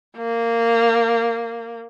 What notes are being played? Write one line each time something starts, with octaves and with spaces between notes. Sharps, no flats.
A#3